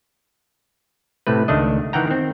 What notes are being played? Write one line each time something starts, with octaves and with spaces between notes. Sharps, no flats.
A2 C3 A3 B4
C#2 D#3 A3 D4 D#5
D#3 E3 F#5 G5 A#5
D#3 C4